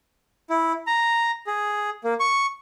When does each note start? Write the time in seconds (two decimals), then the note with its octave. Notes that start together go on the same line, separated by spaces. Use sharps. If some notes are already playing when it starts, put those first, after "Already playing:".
0.50 E4
0.87 A#5
1.47 G#4
2.04 A#3
2.20 C#6